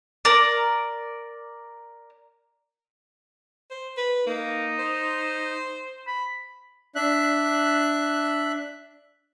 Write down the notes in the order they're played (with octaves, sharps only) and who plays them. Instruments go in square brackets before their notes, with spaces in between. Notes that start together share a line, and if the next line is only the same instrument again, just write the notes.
[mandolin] A#4 D5
[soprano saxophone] C5
B4
[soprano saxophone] A#3 [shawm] D#4
[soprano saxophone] C5
[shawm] B5
[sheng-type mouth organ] D4 E5 F#6